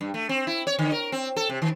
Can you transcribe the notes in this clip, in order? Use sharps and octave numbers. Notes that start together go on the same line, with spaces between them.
G2
A3
C4
E4
C#5
D3
A#4
C4
A4
C3
D#3